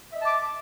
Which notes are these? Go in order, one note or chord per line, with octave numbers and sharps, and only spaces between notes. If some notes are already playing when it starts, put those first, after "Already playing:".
D#5 E5 A5 D6